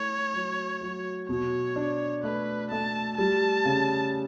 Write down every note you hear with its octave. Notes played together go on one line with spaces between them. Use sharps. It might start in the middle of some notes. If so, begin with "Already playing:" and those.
Already playing: A3 E4 C#5
F#3
F#3
B2 C#5
D4
A3 B4
A3 A5
G3 A5
C#3